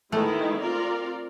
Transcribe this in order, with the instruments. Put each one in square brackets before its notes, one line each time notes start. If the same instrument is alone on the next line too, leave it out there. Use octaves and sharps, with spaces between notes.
[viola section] D#3 G#3 B3 E4 [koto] A3
[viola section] C4 F4 A#4 D5